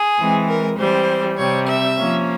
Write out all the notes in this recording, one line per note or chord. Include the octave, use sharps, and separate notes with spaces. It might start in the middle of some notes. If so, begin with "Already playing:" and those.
Already playing: G#4
E3 G#3 C4
A#4
E3 G3 C4 C5
C3 G3 C4 C#5
E5
F3 A#3 C#4